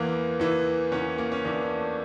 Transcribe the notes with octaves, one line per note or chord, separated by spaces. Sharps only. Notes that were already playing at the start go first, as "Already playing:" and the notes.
Already playing: E2 E3 A#3
E2 E3
E2 E3 C#4
A#3
C#4
E2 E3 D4
D4
A3